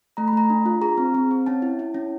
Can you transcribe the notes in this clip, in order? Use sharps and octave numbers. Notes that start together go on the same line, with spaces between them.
A3 A#5
B5
A3 A#5
D4
F4
G#4 A#5
C4
C4
C4
C#4 A5
E4
E4
C#4